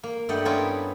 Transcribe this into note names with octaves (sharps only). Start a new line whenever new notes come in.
A#3
G2 A3 D5 D#5 F#5 G5
B3 C#4 E4 F4 A4 A#4